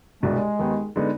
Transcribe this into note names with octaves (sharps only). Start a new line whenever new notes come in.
C2 B2 G3 G#3 D4
D#2 D#3 B3 D#4
D3 G#3 B3 D#4